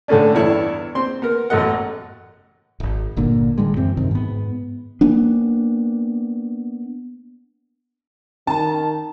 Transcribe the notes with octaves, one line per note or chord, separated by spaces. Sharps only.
A2 D3 A3 C#4 D4
E2 G2 D4 E4 C#5
C4 C6
B3 A#4
A1 F#2 A3 D#5 F#5
D1 G#1
G1 A#2 D3 A#3
A2 D3 G3 G#3
F#2 E3 C4
F#2 C3 D#3
G#2 B3
A#3 B3 D4
D#3 C#4 A5 A#5